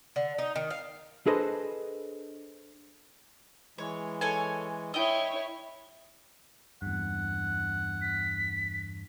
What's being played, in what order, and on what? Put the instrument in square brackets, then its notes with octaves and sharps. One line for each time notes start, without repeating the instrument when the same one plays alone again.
[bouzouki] D3
D#4
D#3
F5
[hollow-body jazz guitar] D4 G#4 A4 B4 C5 D#5
[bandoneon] E3 G#3 [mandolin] C#5
[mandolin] A4 C#5 G#5
[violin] E4 C#5 [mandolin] D#5 G5
[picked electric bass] E2 G2 [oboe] F#5
[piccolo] B6